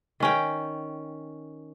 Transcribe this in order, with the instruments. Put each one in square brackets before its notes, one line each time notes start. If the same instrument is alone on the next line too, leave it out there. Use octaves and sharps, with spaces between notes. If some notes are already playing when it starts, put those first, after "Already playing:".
[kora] D#3 C#4 G5